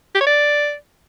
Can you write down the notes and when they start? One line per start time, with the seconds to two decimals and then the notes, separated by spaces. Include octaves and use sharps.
0.15 G4
0.21 C#5
0.27 D5